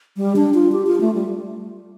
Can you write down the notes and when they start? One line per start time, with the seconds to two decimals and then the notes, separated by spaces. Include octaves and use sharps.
0.17 G3
0.36 D4
0.54 F4
0.72 G4
0.87 F4
1.01 A3
1.15 G3